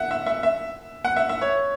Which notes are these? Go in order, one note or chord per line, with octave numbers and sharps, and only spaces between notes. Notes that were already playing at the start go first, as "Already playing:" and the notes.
Already playing: E5 F#5
E5
E5
E5
F#5
E5
E5
C#5